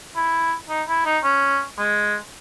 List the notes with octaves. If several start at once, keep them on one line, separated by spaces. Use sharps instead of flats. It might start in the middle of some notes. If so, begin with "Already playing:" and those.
E4
D#4
E4
D#4
C#4
G#3